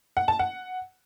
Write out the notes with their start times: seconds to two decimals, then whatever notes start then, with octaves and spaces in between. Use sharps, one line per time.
0.17 F#5
0.28 A5
0.39 F#5